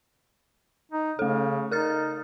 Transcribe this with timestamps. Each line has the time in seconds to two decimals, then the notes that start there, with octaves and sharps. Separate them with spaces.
0.92 D#4
1.19 C#3 A3 A4
1.71 D#4 A#4 F6 A6